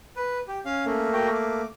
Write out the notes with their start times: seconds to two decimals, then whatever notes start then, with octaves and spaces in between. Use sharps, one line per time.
0.16 B4
0.48 G4
0.65 C#4 F5
0.85 A3 A#3 C#4
1.13 F#4 A#4 G5
1.34 D6